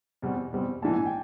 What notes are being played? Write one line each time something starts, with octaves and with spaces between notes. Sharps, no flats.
E2 B2 G3 C4
E2 B2 G3 C4
A#1 G#2 E3 A5
G#5
G5